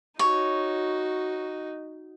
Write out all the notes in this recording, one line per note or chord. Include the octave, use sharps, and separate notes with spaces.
D#4 F#4 C#5